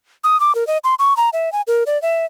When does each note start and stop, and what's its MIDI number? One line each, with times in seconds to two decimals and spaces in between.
0.24 0.39 87
0.40 0.55 86
0.55 0.66 70
0.67 0.78 75
0.84 0.95 84
0.99 1.16 85
1.17 1.30 82
1.33 1.52 76
1.52 1.62 80
1.67 1.84 70
1.86 2.00 74
2.02 2.26 76